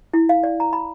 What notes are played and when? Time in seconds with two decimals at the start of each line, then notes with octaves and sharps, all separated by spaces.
0.14 E4
0.29 F5
0.43 D5
0.60 A#5
0.73 B5